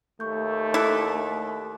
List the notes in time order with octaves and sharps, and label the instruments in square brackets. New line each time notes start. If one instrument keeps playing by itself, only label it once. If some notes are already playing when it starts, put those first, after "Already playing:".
[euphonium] D#2 [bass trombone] A3 [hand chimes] C#6 G6
[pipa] E4 A4 [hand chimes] D6 F#6 B6